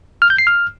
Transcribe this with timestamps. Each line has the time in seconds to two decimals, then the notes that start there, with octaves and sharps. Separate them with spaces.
0.22 F6
0.30 G6
0.38 C7
0.47 F6